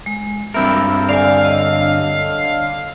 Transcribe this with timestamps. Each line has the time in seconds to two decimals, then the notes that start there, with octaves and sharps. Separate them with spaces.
0.06 G#3
0.54 G2 C4 A#4 E5 B5 E6
1.09 D3 D5 F5 G#5 C7
1.43 C#5 D#5 E6